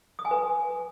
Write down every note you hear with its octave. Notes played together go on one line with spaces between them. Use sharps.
D#6
G#5
B4